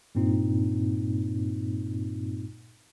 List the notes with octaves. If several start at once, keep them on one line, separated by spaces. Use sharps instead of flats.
G2 A#2 A#3 C4 D#4 F4